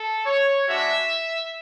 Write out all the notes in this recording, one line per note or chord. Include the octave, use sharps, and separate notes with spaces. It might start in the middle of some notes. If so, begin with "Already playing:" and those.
Already playing: A4
C#5
G#3 D4 F#4 E5